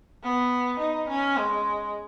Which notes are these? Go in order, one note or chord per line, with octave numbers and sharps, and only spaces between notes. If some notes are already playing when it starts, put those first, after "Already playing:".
B3
D#4
C#4
G#3